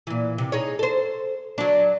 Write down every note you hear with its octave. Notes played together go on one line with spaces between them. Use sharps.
A#2 E3
C3
D#4 G#4 C#5
A4 C5
F#3 D4